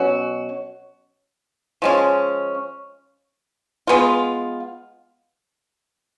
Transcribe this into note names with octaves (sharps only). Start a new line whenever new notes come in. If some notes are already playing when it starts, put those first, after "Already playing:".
Already playing: B2 F#3 C#4 F#4
F3 G#3 C#4
G#3 B3 F4